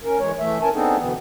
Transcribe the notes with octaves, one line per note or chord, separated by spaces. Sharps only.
C#4 A#4
E3 G#3 C#5
E3 A3 E5
C#4 A#4 G#5 A5
B3 C4 D4 D#4 G#4 A4
B2 D3 E3 B3